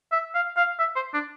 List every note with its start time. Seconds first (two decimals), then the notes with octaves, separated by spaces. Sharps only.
0.12 E5
0.35 F5
0.57 F5
0.79 E5
0.96 C5
1.14 D4